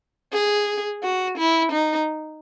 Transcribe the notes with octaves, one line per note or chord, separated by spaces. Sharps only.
G#4
F#4
E4
D#4